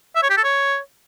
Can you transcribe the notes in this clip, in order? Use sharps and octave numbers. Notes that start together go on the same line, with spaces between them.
E5
C#5
G4
A4
C#5